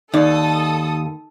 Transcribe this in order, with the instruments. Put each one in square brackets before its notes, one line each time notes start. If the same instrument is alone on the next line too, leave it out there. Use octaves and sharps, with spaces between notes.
[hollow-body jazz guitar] D#2 D5 [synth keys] D#4 [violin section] A4 D#6